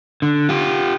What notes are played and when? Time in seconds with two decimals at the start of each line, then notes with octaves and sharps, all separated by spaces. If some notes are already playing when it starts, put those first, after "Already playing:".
0.22 D3
0.49 F4 G4